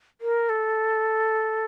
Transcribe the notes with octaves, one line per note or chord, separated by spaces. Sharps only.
A#4
A4